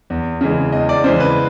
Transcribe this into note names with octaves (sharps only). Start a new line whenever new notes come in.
E2
C#3 E3 G#3
E2 D#5
D5
C#3 E3 G#3 C5
B4